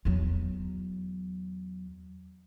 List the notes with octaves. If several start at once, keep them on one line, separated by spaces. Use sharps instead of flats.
E2 F#3